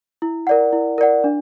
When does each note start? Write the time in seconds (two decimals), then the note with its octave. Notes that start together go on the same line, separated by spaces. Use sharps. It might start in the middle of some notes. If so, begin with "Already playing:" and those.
0.22 E4
0.47 A#4 D5 F#5
0.73 E4
0.98 A#4 D5 F#5
1.24 D4